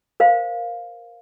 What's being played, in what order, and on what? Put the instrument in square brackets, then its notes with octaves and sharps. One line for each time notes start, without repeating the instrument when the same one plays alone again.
[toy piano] A#4 C5 F5